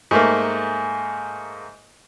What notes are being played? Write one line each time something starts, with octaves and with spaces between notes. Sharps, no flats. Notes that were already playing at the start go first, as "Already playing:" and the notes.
G#2 A3 A#3